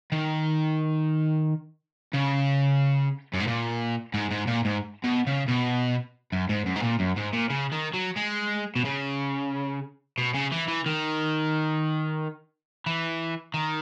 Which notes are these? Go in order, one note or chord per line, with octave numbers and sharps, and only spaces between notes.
D#3
C#3
F#2
G#2
A#2
G#2
G#2
A#2
G#2
B2
C#3
B2
F#2
G#2
F#2
G#2
A#2
F#2
G#2
A#2
C#3
D#3
F#3
G#3
B2
C#3
B2
C#3
E3
E3
D#3
E3
D#3